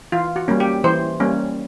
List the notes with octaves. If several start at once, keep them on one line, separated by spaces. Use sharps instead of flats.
E3 F4
F#4
G3 A#3 C#4
G4
E3 C5
G3 A#3 C#4